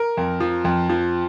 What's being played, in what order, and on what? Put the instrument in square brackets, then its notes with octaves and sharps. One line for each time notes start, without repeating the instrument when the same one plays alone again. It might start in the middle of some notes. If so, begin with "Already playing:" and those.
Already playing: [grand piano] A#4
F2
F3
F2
F3